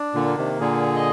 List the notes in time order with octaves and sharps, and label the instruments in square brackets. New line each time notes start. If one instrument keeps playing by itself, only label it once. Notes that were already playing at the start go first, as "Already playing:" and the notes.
Already playing: [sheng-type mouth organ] D4
[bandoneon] A#2 D3
[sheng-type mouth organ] A#3
[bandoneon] C3 D#3
[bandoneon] A#2 D3 [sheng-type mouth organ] G#4
[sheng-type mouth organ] D#5